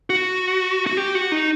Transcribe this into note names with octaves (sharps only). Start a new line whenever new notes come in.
F#4
F#4
G4
F#4
D#4